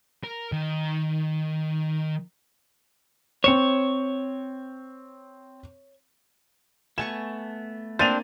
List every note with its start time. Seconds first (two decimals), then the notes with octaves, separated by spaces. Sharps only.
0.24 A#4
0.52 D#3
3.44 C4 C#5 C#7 E7
6.98 A3 B3 G#5 A5 C#6 E7
7.99 A#3 C4 D4 C5 A6 D#7 F7